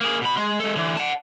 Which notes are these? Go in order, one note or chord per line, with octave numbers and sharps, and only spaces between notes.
A#3 G#4
B2 B5
G#3 C6
G#3 A4
D3 E3
F#5 A5